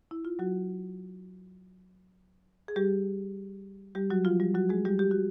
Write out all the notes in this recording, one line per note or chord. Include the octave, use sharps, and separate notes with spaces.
E4
F4
F#3 F#4
G#4
G3 G4
G3 G4
F#3 F#4
F3 F4
G3 G4
F#3 F#4
G#3 G#4
G3 G4
G4
F#4